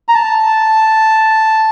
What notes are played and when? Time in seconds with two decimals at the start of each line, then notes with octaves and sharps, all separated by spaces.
0.08 A#5
0.14 A5